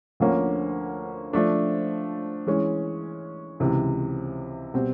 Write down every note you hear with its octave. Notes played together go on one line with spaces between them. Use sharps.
D2 D3 F3 A#3 C#4
F3 A3 D4
E3 G#3 C#4
C#2 C3 E3
B2 G3 C4